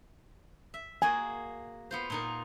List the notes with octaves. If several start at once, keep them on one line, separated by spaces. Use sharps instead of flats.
E5
A#3 F#4 G#4 G#5
B3 F4 C5
A#2 D#4 A#4